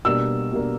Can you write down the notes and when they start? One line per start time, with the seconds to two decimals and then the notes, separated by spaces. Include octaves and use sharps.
0.05 B2 G3 A#3 D4 E6
0.53 B2 G3 A#3 D4